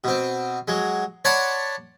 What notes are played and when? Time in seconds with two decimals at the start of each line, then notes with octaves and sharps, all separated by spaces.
0.04 B2 C4
0.68 F#3 G#3
1.25 C#5 D5 F#5 A5 B5 C6